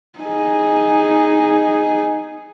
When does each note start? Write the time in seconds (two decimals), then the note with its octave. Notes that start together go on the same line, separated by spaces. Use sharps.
0.19 D#4 G#4